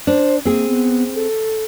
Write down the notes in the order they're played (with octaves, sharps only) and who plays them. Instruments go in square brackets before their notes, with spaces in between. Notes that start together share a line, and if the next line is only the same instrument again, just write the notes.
[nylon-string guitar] D4 [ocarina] C5
[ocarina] A#3 [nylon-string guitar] C4 G#4
[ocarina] B3
A4